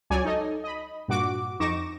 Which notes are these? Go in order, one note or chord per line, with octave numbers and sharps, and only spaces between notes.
C#2 F#3 C#5 D5 G#5
D#4 A4 D#5
D#5 B5
G2 A#2 F#4 D6
F2 D#4 C#6 D6 A#6 E7